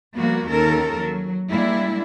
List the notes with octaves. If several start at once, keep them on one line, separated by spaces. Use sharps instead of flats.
F3 G3 A#3 B3 F#4
D#2 D#3 C#4 A4 A#4
F#3
G3 G#3 A#3 D4 E4